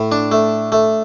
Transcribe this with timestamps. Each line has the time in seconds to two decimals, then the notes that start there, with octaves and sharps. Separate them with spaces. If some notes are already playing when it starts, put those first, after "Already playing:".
Already playing: A2
0.12 D4
0.32 A3
0.72 A3